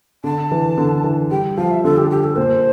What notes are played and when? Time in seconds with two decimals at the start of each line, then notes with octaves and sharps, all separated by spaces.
0.24 D3 A5
0.52 E3
0.78 D3
1.04 E3
1.31 G3 G5
1.57 F3 F5
1.71 E5
1.84 D3 A4
1.97 G4
2.10 G4
2.24 A4
2.37 A#2 C5